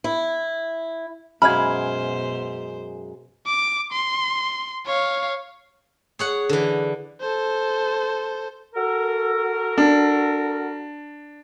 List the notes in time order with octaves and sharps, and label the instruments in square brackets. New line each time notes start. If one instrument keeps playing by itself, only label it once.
[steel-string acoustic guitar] E4
[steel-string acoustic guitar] F#2 G#3 F5 [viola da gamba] B2 C5 [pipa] B5 [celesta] F6 G#6
[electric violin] D6
C6
C#5 F5
[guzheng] G#4 C#5 F#5
D3 E3
[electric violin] A4 C5
[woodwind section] F#4 A4 A#4
[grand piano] D4